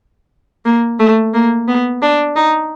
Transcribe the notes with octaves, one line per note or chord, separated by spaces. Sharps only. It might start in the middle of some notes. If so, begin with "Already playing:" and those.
A#3
A3
A#3
B3
D4
D#4